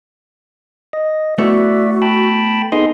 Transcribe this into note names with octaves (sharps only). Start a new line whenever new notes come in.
D#5
A3 B3 E4 F#4 D5 E5
G5 A5 B5
B3 D#4 G#4 A4 C6